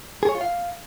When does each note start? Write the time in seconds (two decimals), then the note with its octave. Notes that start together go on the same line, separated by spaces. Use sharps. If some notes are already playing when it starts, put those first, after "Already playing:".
0.23 G#4
0.29 C#5
0.35 F4
0.41 F5